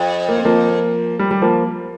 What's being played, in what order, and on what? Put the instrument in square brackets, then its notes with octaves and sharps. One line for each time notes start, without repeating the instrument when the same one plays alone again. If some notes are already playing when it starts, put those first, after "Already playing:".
Already playing: [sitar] F2
[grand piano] A#3
C4
F3 A#3
G3
G3
F3 A#3